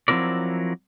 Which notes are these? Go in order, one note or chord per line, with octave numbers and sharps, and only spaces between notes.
F3 F#3 C4 E4 A#4 D5